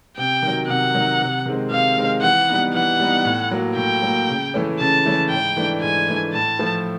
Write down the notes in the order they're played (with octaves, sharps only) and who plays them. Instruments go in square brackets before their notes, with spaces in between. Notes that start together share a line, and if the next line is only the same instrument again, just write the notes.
[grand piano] C3 [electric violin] G5
[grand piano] D#3
F#3
[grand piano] C3 [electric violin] F#5
[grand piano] D#3 F#3
C3
D#3 G#3 C4
[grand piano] C3 [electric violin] F5
[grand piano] D#3 G#3 C4
[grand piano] E3 [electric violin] F#5
[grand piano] G3 B3 D#4
[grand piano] E3 [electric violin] F#5
[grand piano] G3 B3 D#4
A2
F#3 A#3
[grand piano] A2 [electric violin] G5
[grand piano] F#3 A#3
C#3
E3 A3 C#4
[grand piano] C#3 [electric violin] A5
[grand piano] E3 A3 C#4
[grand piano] G#2 [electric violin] G5
[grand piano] E3 A3 D4
[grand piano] G#2 [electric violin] G#5
[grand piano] E3 A3 D4
[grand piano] A2 [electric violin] A5
[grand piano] F3 A3